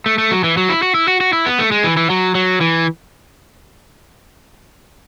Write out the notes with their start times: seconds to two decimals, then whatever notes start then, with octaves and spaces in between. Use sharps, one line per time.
0.06 A3
0.18 A3
0.31 F#3
0.44 E3
0.57 F#3
0.69 E4
0.82 F#4
0.95 E4
1.08 F#4
1.20 F#4
1.33 E4
1.46 B3
1.59 A3
1.72 G#3
1.84 E3
1.97 E3
2.10 F#3
2.35 F#3
2.61 E3